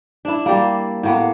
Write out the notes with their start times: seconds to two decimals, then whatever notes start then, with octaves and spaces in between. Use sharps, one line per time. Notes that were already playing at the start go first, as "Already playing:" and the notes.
0.25 D4 E4
0.46 G3 A#3
1.03 A2 A#3 B3